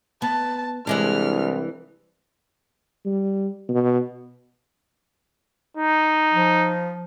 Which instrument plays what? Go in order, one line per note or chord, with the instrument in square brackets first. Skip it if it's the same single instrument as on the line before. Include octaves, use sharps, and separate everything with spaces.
[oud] B3 [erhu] A5
[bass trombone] C2 [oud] E3 G#3 D4 [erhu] F6
[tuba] G3
B2
[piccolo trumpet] D#4
[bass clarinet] F3